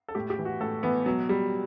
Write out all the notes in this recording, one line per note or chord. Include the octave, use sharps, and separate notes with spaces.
A4
A2 G4
G4
E3
F#4
A2 A4
E3 B3
B2 F#3
G3